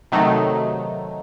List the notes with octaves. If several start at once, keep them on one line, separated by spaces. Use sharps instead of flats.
C3 D#3 F#3 A3 D#4